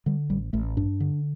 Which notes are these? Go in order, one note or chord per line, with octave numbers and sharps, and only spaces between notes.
D3 G3
A1 G3
A1 A3
G2 D4
D3